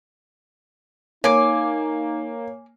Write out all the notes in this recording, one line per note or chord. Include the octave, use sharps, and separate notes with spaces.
A#3 D#4 C#5 G#5 D6